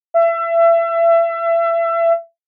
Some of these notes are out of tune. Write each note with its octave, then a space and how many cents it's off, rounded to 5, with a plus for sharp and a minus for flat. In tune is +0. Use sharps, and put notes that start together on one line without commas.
E5 +30